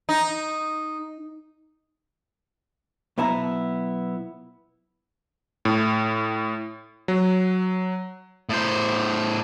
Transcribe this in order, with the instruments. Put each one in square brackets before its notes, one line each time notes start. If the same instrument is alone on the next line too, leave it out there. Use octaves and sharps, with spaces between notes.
[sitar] D#4
[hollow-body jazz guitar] B1 B3 E4 A5 A#5
[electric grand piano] A2
F#3
[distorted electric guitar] A2 C5